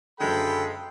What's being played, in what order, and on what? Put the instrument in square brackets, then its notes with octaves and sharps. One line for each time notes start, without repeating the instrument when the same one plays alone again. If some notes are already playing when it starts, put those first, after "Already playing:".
[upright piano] F#1 F#2 D3 [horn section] F3 G#3 [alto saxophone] A4 [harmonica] G5 B5